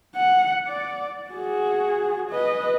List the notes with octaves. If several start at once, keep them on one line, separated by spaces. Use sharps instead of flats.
F#5
D5
F#4 G#4
B4 D#5